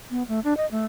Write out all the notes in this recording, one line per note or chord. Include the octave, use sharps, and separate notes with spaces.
B3
A3
D4
D#5
A3